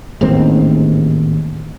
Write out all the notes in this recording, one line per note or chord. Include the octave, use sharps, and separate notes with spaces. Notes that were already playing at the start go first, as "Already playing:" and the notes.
A1 D#2 G#2 C4